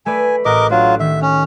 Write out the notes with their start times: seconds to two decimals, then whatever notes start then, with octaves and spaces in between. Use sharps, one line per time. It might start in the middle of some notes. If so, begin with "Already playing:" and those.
0.06 A3 B4 D5 G#5
0.45 A1 A#4 D#5 F#5 D6
0.71 F#3 A3 D4 F4
1.00 D#3 E5
1.22 C#4